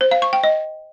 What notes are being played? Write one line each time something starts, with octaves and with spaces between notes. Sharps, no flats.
C5
F5
C#6
G5
D#5